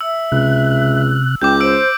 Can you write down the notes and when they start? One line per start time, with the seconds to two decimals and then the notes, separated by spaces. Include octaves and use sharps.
0.01 E5 E6
0.32 C#2 C3 F#6
1.42 C#2 G5 D6 G6
1.60 C5 E6 D7